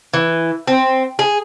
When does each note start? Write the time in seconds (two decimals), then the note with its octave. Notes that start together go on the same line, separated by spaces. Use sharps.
0.14 E3
0.68 C4
1.19 G#4